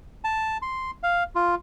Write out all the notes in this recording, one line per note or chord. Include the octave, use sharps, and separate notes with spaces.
A5
C6
F5
F4